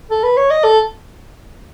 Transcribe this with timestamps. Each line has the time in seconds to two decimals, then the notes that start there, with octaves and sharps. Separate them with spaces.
0.11 A4
0.23 B4
0.37 C#5
0.50 D#5
0.64 A4